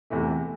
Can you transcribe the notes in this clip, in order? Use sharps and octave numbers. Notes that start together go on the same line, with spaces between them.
E2 C3 E3 A3